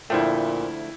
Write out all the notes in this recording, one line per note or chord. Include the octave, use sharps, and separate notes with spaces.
D2 A#2 F3 A3 E4 G5